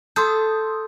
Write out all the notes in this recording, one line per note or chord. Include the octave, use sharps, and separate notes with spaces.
A4 C6 D#6 G6